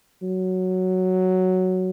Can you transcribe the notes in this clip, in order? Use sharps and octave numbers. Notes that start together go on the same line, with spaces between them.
F#3